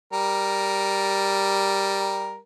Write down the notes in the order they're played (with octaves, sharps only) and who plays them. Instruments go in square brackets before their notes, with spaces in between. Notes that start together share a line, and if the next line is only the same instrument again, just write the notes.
[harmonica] G3 A#4